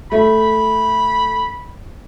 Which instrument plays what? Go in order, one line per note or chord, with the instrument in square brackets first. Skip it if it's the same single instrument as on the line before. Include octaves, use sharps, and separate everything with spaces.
[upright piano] A3 [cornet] B5